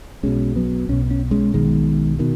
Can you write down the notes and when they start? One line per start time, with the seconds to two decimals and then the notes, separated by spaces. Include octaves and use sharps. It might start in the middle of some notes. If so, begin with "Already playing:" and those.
0.23 B1 B2 G#3 C#4
0.56 F#3 B3
0.89 B1 B2 C#4
1.11 C#4
1.31 G#3 C#4
1.54 B1 B2 D#3 G#3
2.19 B2 D#3